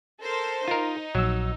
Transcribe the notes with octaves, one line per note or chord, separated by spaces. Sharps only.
A4 A#4 C5
D#4 F4 A#4
A#1 F#3 E6